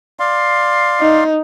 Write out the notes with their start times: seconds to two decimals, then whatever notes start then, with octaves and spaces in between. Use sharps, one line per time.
0.20 D5 F5 C6
1.01 D#4